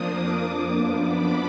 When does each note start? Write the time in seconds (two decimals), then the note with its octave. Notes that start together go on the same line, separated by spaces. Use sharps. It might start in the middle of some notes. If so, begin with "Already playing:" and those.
Already playing: F2 F3 A#3 D4 D#6
0.13 D6
0.72 F#2 F3 B3 D4 D6
1.01 B5